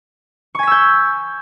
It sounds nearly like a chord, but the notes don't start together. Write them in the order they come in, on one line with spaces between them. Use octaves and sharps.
C#6 G#5 B6 E6 G6